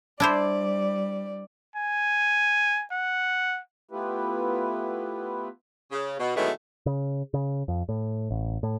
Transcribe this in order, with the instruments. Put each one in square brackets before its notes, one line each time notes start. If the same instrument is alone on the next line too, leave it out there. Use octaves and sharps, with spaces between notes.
[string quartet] G3 D5 [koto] D4 E4 C5
[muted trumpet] G#5
F#5
[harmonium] A3 B3 E4 F4 G4 B4
[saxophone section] C#3
B2
B2 D#3 E3 F#3 G#3 A3
[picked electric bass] C#3
C#3
F2
A2
A1
A2